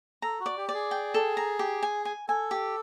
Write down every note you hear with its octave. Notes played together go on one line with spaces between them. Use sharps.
A4 A#5
F#4
D5
G4
D5
G#4
G5
A4
A#5
G4
G#5
G#5
A4 G#5
G4